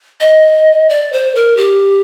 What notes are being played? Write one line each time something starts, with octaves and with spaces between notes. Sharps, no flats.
D#5
D5
C5
A#4
G4